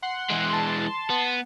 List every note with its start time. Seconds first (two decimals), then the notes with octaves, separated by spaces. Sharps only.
0.02 F#5 C6 F#6
0.30 E3 G#3
0.49 A5 C6
1.10 B3